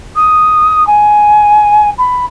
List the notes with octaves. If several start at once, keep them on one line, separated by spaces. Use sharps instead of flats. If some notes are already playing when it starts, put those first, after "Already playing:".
D#6
G#5
B5